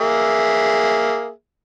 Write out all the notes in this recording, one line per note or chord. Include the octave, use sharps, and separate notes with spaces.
A#3 G#4 E5